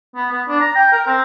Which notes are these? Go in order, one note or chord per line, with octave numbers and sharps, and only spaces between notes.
B3
B3
D4
A#5
G5
A#4
C4